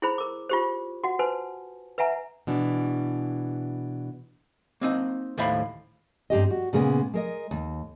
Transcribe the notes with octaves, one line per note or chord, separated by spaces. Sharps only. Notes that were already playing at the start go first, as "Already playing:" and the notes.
E4 G#4 C5 B5
A#4 D6
F4 G4 C5
F#4 F#5
B4 C5 G#5 A5
B4 E5 F#5 G#5 A#5
B2 E3 D4
A#3 C4 D#4
D#2 A2 C5 E5 F5 B5
G2 C4 G4 D#5
F#4
A#2 C#3 G#3 A#3 B3
G#3 A#4 D#5
D#2